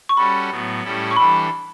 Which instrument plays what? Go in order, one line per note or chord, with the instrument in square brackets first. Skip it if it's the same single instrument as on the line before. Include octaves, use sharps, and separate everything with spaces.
[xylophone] C#6
[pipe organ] G3 C#4 F#4 A4 [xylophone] B5
[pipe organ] A2 F#3 B3
A2 G3 C#4 E4 A4
[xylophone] C#6
[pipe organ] E3 G3 D4 A4 [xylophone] B5